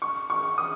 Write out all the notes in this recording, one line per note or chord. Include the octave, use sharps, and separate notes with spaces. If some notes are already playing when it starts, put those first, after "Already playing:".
C#6
C#6
D#6